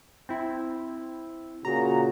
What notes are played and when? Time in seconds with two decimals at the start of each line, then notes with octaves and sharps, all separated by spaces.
0.29 C4 E4
1.65 A#2 C#3 F#4 A#5